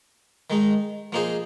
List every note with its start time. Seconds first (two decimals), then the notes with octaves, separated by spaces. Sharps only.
0.50 D#3 G#3 D#4
1.12 F3 A#3 D#4 G#4 C5